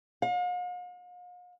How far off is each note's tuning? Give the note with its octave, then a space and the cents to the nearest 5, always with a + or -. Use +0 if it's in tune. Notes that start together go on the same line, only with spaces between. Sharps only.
F5 +45